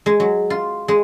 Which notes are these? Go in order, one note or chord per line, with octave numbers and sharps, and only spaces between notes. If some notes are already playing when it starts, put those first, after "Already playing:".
G#3
F#3
F4
G#3